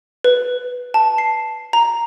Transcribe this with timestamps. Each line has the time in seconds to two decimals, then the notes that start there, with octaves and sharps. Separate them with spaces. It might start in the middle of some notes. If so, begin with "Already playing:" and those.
0.24 B4
0.94 A5
1.18 C7
1.73 A#5